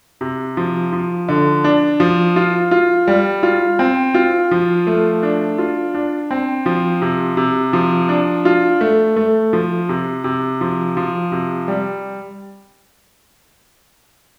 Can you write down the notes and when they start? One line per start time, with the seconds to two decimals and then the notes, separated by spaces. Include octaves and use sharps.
0.21 C3
0.57 F3
0.93 F3
1.28 D3
1.64 D4
2.00 F3
2.36 F4
2.71 F4
3.08 G3
3.43 F4
3.79 C4
4.14 F4
4.51 F3
4.87 A3
5.23 D4
5.58 F4
5.95 D4
6.31 C4
6.66 F3
7.02 C3
7.37 C3
7.73 F3
8.09 D4
8.45 F4
8.81 A3
9.16 A3
9.53 F3
9.89 C3
10.24 C3
10.61 F3
10.97 F3
11.32 C3
11.68 G3